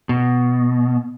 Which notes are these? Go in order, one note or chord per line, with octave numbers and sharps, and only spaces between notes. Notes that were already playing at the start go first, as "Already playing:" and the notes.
B2